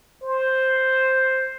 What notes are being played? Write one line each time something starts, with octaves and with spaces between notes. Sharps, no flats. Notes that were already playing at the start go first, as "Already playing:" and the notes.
C5